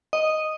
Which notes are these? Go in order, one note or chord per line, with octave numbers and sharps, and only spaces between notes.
D#5